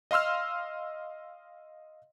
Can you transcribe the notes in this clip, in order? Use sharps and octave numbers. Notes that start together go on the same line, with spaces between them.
D#5 F5 C6 E6 F6